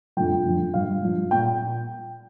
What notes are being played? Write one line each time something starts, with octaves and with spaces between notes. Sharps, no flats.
F2 D3 F3 G5
F2 D3 F3
G2 F3 F5
G2 F3
A#2 G5